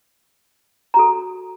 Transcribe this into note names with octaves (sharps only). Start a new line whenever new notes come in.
F#4 A4 A#5